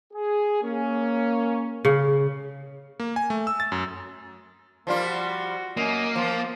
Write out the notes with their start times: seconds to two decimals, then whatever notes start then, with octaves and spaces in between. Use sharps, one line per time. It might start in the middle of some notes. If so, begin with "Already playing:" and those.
0.13 G#4
0.62 A#3 C#4
1.85 C#3
3.00 A#3
3.16 G#5
3.30 A3
3.47 E6
3.60 A6
3.72 F#2
4.87 F3 G3 A#3 F4
5.05 F#4
5.77 F#2 A#3 D#5
6.16 F3 F4